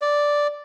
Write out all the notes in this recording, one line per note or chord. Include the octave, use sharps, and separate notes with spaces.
D5